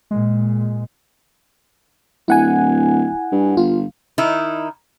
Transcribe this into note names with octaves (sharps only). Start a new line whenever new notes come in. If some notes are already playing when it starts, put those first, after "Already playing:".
A#2 G#3
D1 E4 F#5 G#5
G2
G1 F4
D#3 D#4 E4